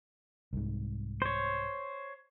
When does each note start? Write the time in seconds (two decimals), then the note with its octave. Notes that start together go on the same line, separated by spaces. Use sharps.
0.53 C2 G#2
1.22 C5 C#5